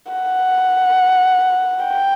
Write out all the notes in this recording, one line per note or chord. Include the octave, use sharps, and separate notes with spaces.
F#5
G5